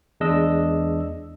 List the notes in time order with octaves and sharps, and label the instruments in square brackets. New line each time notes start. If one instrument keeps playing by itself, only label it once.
[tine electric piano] E2 G#3 D4 D#5 E6